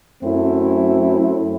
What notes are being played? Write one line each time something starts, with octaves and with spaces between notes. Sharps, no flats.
F#2 F#3 A3 C4 E4